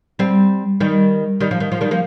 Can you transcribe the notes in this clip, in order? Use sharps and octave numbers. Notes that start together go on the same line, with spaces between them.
G3 C4
D#3 G3
D#3 G3
F3
D#3
F3
D#3 G3
F3 A#3